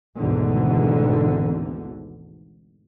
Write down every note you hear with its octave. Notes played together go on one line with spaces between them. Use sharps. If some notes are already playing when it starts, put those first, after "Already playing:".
G#1 D2 G#2 B2 D3 E3